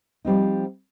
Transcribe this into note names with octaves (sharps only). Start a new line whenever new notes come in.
F3 G3 C4 D#4